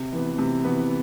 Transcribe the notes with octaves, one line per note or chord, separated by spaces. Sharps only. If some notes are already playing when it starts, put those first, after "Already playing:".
Already playing: C3
E3 B3
C3
E3 B3